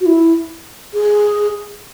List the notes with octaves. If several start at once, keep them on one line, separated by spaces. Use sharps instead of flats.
F#4
E4
G#4